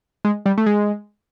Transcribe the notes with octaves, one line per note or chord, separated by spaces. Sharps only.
G#3
G3
A3
G#3